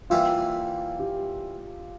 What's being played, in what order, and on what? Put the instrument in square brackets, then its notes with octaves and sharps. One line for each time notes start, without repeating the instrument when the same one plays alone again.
[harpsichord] E3 G3 A#3 E4 [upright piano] F4
[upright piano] G4